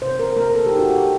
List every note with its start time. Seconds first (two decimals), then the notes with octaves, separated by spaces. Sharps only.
0.02 C3 C5
0.19 A#4
0.37 A#3 A#4
0.55 A4
0.66 D#4 G4
0.79 F#4
0.90 G4